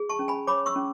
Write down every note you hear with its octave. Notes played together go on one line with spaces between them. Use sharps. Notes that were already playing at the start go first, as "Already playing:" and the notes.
Already playing: G#4
A5 C#6
C#4
G#5 B5
C#5 B5 D6
C#6 E6
C#4